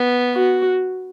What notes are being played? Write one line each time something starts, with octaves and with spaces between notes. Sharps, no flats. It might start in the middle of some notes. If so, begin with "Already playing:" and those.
Already playing: B3
F#4